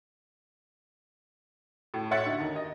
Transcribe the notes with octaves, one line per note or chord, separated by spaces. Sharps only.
A2
C#5 E5 F#5 A6
D3 D#4
D#2
D#5